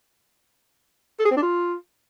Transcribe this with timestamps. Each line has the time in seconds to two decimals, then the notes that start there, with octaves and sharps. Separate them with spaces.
1.19 A4
1.25 G#4
1.31 C4
1.37 D4
1.42 F4